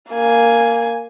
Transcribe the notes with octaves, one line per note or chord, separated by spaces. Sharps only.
A#3 G#5